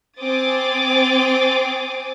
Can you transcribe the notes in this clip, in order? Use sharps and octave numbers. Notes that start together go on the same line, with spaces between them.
C4 G#5 D6 D#6 A6